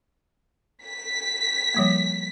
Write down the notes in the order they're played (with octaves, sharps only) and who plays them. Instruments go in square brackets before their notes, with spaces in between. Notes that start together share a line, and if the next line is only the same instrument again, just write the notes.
[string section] B6
[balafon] F3 G3 A#3